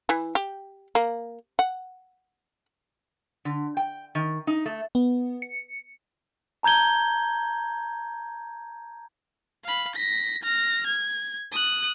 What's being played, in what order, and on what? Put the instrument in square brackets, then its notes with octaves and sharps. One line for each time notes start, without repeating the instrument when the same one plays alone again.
[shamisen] E3
G4
A#3
F#5
[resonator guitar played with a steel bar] D3
G5
D#3
D#4
A3
[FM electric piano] B3
C#7
[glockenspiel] A5 A#5 G6 G#6 G7
[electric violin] F5 B5
A#6 B6
F6 A#6
G#6
D#6 F#6